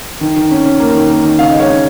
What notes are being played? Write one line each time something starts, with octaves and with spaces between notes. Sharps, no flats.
D#3
D#3
C#4
C#4
A#3
D#3
A#3
D#3
C#3 F5
D#5
G#3
C#5 F5
C#4